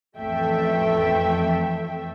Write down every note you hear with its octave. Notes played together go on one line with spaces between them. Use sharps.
A1 F2 A3 A4 E5 G5